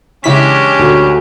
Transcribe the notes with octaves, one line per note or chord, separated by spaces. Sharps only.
C#3 E3 G#3 C#4 D4 G4 B6
D2